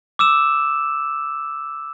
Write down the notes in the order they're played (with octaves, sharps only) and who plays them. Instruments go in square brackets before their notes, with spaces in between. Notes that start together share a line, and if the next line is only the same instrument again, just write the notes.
[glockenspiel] D6 E6 E7